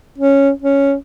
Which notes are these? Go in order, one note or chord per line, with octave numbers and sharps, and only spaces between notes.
C#4
C#4